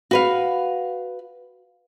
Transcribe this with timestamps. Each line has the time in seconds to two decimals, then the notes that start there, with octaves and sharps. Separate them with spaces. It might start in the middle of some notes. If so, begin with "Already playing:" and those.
0.11 F#4 B4 F5